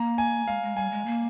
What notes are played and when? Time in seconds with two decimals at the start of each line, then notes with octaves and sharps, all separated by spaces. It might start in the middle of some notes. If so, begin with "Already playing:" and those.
Already playing: A#3 A#5
0.18 G#5
0.48 G#3 F5
0.62 G#3
0.76 G3 G#5
0.91 G#3
1.06 A#3